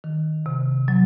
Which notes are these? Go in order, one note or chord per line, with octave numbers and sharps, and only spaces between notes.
D#3
C3
F#3